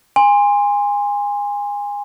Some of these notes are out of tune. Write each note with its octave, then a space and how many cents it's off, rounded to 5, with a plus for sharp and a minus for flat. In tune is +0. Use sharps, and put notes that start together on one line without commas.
G#5 -25 C6 +0